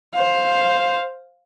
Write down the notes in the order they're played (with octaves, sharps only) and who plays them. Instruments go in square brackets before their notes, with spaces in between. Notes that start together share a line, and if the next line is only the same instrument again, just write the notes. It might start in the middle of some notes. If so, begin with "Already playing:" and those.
[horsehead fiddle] C5 F5